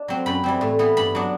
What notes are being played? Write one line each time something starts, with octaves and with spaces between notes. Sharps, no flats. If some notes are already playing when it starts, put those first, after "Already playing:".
Already playing: D4
F#3 C4
F#2 B5
E3 G3 C4
A2
E3 B3
G2 B5
F#3 B3 D4